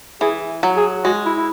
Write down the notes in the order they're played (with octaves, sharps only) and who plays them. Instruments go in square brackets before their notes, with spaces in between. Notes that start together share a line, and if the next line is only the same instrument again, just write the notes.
[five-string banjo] E3 [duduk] G#4
[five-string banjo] F#3
[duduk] G#4
[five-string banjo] G#3 [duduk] F#4
[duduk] E4
E4